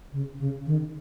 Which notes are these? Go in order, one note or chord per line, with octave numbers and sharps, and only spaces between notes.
C#3
C#3
D#3